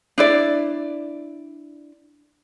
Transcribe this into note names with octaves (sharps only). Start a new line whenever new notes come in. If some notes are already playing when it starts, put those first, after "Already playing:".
D4 E4 D5